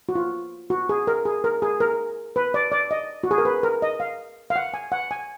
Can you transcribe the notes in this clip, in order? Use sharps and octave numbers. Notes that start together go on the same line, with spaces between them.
F#4
F4
F#4
G#4
A#4
G#4
A#4
G#4
A#4
B4
D5
D5
D#5
F#4
G#4
A#4
B4
A#4
D#5
F5
F5
F#5
G#5
F#5
G#5